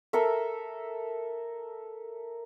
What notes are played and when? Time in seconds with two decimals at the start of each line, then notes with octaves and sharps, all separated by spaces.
0.13 A4 A#4 E5